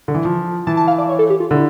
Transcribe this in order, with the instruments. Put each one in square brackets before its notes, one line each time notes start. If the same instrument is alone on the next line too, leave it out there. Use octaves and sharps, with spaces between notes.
[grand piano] D3
E3
F3
[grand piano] E3 [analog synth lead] A5
[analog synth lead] A5
F5
D5
C#5
A4
G4
F4
[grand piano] D3 [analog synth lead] E4